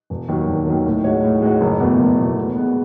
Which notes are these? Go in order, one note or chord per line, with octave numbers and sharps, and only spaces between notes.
E1
D#2 D#3 F#3
E1
D#2 D#3 F#3
A2
G#3 D#4 F#4 C#5
A2
G#3 D#4 F#4 C#5
F#1
E2 B2 A3
F#1
E2 B2 A3
B2
G#3 B3